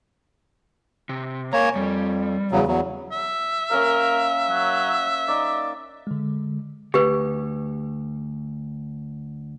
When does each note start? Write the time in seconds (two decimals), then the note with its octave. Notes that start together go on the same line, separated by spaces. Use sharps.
1.09 C3
1.53 A#3 C#5 G#5 A#5
1.76 F2 G3
2.52 E2 C#3 F#3
2.67 E2 F#3
3.12 E5
3.71 A#3 C#4 A#4 F5
4.50 F#3
5.28 D#4 D5
6.07 D3 G#3
6.94 D2 G4 B4